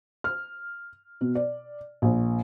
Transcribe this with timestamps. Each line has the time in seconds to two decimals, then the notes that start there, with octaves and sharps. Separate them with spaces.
0.24 F6
1.21 B2
1.35 D5
2.02 A#1